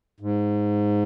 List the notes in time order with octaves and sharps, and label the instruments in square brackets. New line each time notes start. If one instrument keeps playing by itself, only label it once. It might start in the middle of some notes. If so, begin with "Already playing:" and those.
[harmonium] G#2